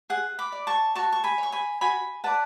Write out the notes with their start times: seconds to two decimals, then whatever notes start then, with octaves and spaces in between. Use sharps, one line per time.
0.10 G#4 F#5
0.39 B5 D6
0.52 D5
0.67 A5 C#6
0.95 F#4 A5 C#6
1.12 C#6
1.24 G#5 B5
1.38 C#5 C#6
1.52 G#5 B5
1.81 F#4 G#5 B5
2.24 B4 D5 F#5 A5